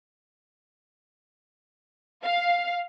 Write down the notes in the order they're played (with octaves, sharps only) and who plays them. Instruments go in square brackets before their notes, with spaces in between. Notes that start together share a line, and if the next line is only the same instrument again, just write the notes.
[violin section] F5